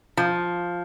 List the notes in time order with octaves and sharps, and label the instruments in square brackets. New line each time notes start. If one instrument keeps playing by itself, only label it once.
[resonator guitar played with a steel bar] F3